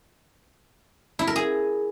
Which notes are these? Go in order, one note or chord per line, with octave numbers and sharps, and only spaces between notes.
E4
A#4
G#4